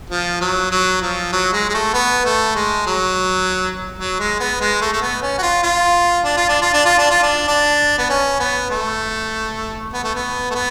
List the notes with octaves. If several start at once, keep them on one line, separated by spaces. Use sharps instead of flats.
F3
F#3
F#3
F3
F#3
G#3
G#3
A3
B3
A3
G#3
F#3
F#3
G#3
B3
G#3
A3
A3
B3
C#4
F#4
F4
F4
D4
F4
D4
F4
D4
F4
D4
F4
D4
D4
B3
C#4
B3
A3
B3
A3
B3
A3
B3